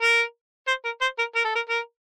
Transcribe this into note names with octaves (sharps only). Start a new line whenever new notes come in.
A#4
C5
A#4
C5
A#4
A#4
A4
A#4
A#4